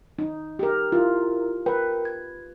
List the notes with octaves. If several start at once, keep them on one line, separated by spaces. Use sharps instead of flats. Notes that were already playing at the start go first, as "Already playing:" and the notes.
D#4
G4 A#4
E4 F4 A#4
A#4 B4 G5
G#6